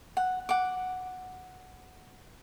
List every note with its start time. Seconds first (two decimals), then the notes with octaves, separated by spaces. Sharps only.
0.17 F#5
0.49 F#5 D6